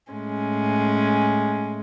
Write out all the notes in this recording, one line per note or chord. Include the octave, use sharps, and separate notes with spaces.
A2 G#3 C#4